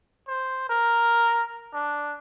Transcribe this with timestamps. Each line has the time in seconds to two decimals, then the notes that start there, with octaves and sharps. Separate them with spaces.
0.28 C5
0.69 A#4
1.74 D4